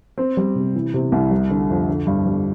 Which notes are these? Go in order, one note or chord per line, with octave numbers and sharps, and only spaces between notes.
C4
G3
C3
E3
C3
C2
G3
D3
F2
D3
G2
G3